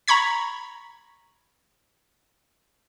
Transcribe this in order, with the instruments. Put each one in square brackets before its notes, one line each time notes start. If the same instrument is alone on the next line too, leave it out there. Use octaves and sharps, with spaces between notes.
[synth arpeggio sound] A#5 B5 C#6 G#6 B6